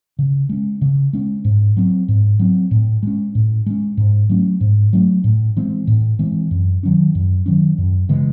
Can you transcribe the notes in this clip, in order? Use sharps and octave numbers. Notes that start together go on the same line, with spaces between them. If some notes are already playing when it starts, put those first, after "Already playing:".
C#3
G#3 C#4
C#3
G#3 C#4
G#2
F#3 C4
G#2
F#3 C4
A2
G#3 C#4
A2
G#3 C#4
G#2
F#3 A3 C#4
G#2
F#3 A3 C#4
A2
E3 G#3 C4
A2
E3 G#3 C4
F#2
D#3 F#3 C#4
F#2
D#3 F#3 C#4
F#2
C#3 E3 G#3